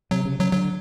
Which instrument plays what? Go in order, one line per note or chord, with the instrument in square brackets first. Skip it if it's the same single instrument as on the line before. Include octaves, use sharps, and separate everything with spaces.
[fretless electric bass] C3 [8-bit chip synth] F#3
[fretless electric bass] C#3
[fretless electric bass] C#3 [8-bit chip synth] F#3
[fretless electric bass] D3 [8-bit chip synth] F#3